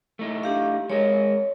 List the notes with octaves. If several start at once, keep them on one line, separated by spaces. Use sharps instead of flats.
A3 D#4 E4
D4 G4 F5
G#3 A#4 C#5 D#5